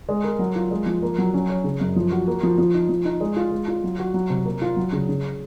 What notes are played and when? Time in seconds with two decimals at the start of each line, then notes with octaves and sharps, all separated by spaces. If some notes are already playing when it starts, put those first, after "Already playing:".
0.09 G#3
0.24 A#4
0.39 F#3
0.56 F4
0.71 G#3
0.86 F3
1.02 A#3
1.18 F#3
1.34 C#4
1.49 C#5
1.64 C#3
1.81 F#2
1.96 F3
2.12 F#4
2.28 A#3
2.43 F3
2.58 F3
2.74 D#4
2.89 F3
3.05 D#4
3.21 G#3
3.36 F4
3.52 G#3
3.68 F4
3.84 F#3
3.99 F#4
4.14 F#3
4.30 C3
4.45 A#3
4.62 F4
4.76 F#3
4.92 C#3
5.09 C#3